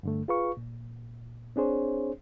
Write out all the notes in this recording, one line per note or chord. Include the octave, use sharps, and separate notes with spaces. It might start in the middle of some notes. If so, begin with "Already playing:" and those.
G2 D3 A3
F4 G#4 B4 F5 C#6
A#2
C4 D4 G#4 C5 C#5